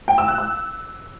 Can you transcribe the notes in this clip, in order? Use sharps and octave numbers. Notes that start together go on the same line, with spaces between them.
G5
E6
F#6
E6